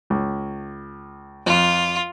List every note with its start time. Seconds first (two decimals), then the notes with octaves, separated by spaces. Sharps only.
0.10 C#2
1.46 F2 F4